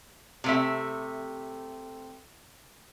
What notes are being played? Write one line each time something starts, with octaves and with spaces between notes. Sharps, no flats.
C3 A3 E5